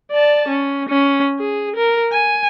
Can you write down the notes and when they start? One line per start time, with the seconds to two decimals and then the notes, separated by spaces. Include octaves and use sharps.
0.11 D5 A5
0.48 C#4
0.89 C#4
1.39 G#4
1.76 A#4
2.12 G#5